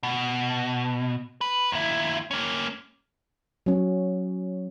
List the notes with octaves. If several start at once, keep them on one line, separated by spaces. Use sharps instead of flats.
B2
B4
D#2 E4
A#3 C#4
F#3 C#4